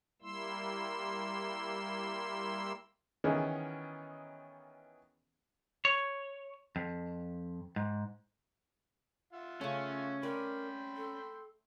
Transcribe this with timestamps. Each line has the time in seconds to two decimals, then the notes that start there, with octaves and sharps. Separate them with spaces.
0.22 G3 A#3 E4 C6 E6
3.24 D#3 E3 B3 C#4 D#4 G#4
5.85 C#5
6.76 F2
7.76 G#2
9.33 F4 E5 F#5
9.61 C#3 A3 C#4
10.23 A#4 D5 G5 B5 C6
10.97 A4